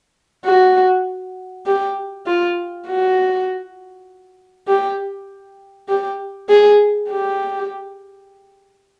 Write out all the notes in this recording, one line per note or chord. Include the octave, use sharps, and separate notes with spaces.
F#4
G4
F4
F#4
G4
G4
G#4
G4